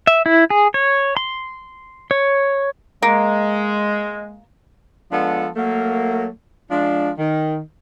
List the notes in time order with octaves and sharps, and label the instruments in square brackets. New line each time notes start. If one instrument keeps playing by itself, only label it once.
[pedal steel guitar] E5
E4
G#4
C#5
C6
C#5
[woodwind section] G#3 [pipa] A#3
[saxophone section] F3 G#3 B3 D4 A4
F#3 A3 A#3
F3 G#3 D4
D#3